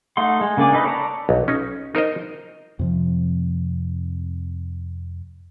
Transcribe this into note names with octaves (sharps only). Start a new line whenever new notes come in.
A3 D#4 F#5 C6
G#3
C#3 A#3 D4 D5 G#5
D#4 A4 B4 D#5
C#5 D5 A5 A#5
B1
C#4 D#4
D#4 A#4 C5 D#5
F2 C3 F3